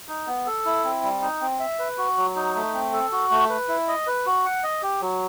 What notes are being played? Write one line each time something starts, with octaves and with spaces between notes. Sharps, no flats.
D#4
B3
A4
E4
C4
G3
D#4
C4
E5
B4
F#4
F#3
D#4
A3
C4
A4
F#4
A3
B4
E4
D#5
B4
F#4
F#5
D#5
G4
F#3